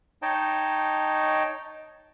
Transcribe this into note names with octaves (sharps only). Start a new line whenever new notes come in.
D#4 C#5 D#5 G5 A5